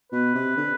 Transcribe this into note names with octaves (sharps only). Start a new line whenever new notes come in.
B2 B4
C3
D3